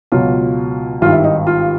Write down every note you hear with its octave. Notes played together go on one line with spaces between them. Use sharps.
C#2 B2 F#3 F4
G#1 G2 D#3 F4
E4
D#4
F4